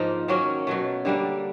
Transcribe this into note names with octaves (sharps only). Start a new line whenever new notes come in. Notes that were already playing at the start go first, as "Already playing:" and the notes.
Already playing: G#2 F3 A#3 D#4
D#3 F#3 A#3 C#4
B2 F#3 A3
D3 G3 A#3 D4